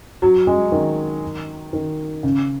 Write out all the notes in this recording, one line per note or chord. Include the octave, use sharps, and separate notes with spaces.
F#3
G#3
D#3
D#3
C#3